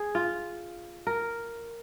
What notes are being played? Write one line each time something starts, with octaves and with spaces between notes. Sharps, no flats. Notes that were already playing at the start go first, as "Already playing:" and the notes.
Already playing: G#4
F4
A#4